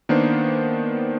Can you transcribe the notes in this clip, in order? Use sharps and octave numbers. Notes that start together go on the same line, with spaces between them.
D#3 A#3 B3 D4 C5